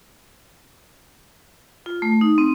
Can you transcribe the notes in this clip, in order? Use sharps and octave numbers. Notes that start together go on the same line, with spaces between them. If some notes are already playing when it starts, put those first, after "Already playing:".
F4
A3
D#4
C4